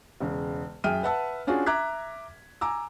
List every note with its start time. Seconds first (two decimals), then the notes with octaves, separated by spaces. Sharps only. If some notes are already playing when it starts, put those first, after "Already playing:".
0.20 E1 C#3
0.84 F#2 G#4 E5 G5 F6 D#7
1.03 B4 E5 F#5 A5 E6
1.47 C#4 D4 F4 F#4 G#4
1.66 E5 A#5 D6 F#6 G#6 B6
2.61 G#5 A#5 D6 E6